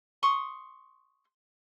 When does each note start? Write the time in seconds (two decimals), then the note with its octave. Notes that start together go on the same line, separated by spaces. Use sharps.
0.23 C6 C#6 D#6